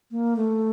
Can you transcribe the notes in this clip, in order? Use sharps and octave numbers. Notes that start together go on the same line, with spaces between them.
A#3
A3